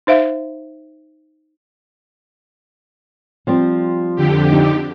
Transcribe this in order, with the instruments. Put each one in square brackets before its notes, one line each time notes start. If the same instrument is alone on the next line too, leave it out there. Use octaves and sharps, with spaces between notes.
[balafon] D#4 C5 E5 F5
[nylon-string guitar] F3 G3 C4
[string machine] F2 D3 G4
[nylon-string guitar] D#4